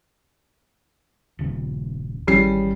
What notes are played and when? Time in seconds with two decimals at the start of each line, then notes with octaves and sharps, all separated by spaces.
1.39 D#1 C#3
2.27 G#1 E3 G3 C#4 G#4 C7